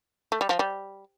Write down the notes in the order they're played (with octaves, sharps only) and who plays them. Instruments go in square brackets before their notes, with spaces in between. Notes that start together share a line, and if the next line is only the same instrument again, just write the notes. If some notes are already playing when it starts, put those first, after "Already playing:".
[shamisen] A3
G3
F3
G3